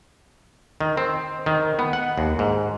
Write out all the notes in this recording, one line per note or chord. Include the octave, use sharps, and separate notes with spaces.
D#3
C4
D#3
B3
F#5
D#2
G#2